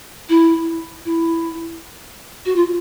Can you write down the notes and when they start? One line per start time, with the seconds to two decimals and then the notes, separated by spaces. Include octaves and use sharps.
0.29 E4
1.05 E4
2.45 F#4
2.56 F4